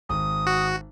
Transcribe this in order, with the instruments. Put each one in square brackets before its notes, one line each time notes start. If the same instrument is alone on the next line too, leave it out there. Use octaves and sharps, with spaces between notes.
[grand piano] G#1 [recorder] D#6
[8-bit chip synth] F#4